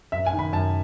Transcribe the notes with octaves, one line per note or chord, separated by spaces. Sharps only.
F#2 E5
G#5
D#3
B5
F#2 A5